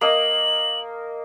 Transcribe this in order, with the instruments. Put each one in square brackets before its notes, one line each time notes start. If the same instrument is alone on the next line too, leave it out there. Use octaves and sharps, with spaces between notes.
[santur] A#3 D#5 [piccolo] F#7